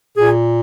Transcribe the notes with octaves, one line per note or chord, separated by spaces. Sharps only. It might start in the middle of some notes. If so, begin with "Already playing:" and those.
A#2 G#4